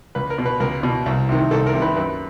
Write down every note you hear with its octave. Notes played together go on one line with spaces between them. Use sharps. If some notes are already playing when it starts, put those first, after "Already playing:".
C#2 B4
A#4
B2
B4
C#2 A#4
B2
C2
C3 D#3
C2 A4
A#4
C3 D#3
B4
F#2 B4